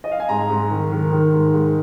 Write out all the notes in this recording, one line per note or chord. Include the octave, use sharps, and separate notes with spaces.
D#5
F5
G#5
G#2 A#5
G#2
D#3
D#3
D#3
G#2
G#2